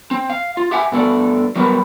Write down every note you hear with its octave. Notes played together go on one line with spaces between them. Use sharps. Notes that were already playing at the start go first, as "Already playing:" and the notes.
C4
F5
F4
G4 E5 F#5 G#5
G2 A3 B3 F#4 A4 D5
F#3 G3 B3 F#4 A#4 B4